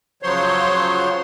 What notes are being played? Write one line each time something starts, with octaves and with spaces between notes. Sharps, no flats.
C#3 F3 F#3 C5 C#5 C6